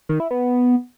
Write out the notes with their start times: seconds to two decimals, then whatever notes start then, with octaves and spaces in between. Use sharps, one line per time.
0.09 D#3
0.20 E4
0.31 B3